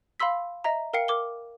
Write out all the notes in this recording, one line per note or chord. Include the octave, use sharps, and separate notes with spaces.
F5 B5 C6 E6 B6
D#5 E5 A#5
A#4 F5 G5 C7 C#7
A#4 D6 G7